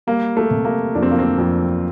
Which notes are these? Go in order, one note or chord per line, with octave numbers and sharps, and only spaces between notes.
G3 A#3
A3
C3
A#3
F2 D4
C4
A#3
C4
F2